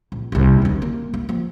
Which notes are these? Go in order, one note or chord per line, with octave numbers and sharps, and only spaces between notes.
A#1
D#1 C2
D#2 D#3
A#3
A#3
F3